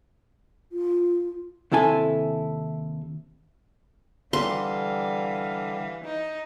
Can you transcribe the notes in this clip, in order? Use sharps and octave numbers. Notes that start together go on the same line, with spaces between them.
F4
D#2 C3 E4 A4 G#5
D3 E3 G3 F5 C6
D#4